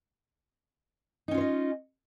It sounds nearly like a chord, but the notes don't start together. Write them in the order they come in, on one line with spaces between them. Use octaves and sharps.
D#4 C#4 F4 C5 D#5